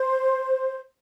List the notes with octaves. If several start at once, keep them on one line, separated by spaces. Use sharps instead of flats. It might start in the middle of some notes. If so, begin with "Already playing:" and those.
Already playing: C5